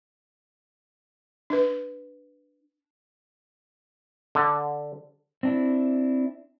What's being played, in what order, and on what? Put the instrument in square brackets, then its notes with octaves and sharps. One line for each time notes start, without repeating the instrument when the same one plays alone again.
[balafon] D4 B4
[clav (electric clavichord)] D3
[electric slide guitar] C4 D4 E4